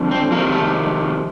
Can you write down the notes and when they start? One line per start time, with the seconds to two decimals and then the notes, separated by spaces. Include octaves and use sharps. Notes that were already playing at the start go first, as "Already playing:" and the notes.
Already playing: F2 D3 F3
0.11 C4
0.31 F2 C3 D#3 A#3
0.52 A3